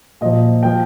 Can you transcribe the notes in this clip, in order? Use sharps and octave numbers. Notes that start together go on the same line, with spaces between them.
A#2 F3 D#5
F3 G5